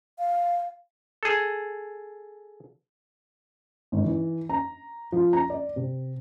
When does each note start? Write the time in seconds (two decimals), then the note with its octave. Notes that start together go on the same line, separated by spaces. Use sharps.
0.19 F5
1.23 G#4 A4
3.92 G#1
4.05 E3
4.49 A#5
5.12 F3
5.33 A#5
5.50 D5
5.76 C3